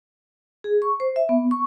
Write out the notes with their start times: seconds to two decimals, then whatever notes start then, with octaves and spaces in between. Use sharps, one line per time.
0.64 G#4
0.82 C#6
1.00 C5
1.16 E5
1.29 B3
1.51 C#6